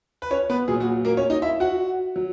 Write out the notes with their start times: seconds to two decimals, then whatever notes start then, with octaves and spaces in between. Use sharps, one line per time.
0.22 B4
0.31 C#4 C#5
0.50 B3 B4
0.68 A#2 F#3 G#4
0.80 F#4
1.05 A#3 A#4
1.17 C#4 C#5
1.30 D#4 D#5
1.42 E4 E5
1.60 F#4 F#5
2.16 F#3